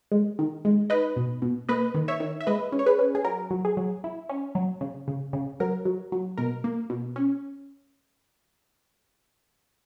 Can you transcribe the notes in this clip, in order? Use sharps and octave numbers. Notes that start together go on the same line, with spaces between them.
G#3
D#3
G#3
D#4 B4 D#5
B2
B2
A#3 B4 D#5
D#3
C#5 E5
D#3
E5
G#3 B4 D#5
C#4
C#5
G#4 B4
C#4
G#4
F#3 A#4
F#3
G#4
F#3
E4
C#4
F#3
C#3
C#3
C#3
F#3 A#4
F#3
F#3
B2 A#4
A#3
B2
C#4